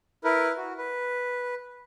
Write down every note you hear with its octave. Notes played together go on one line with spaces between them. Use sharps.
E4 A#4 B4
F#4
B4